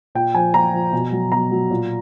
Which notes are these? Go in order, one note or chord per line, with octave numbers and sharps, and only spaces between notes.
A#2 G5
F3 G#5
A#2 A#5
F3
B2
F#3
B2 A#5
F#3
A#2